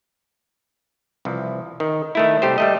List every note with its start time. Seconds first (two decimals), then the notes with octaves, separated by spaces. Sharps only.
1.25 C2 E3 F3
1.80 D#3
2.15 D#3 A3 E4
2.42 C2 A3 G4 C5
2.58 G3 A3 D#5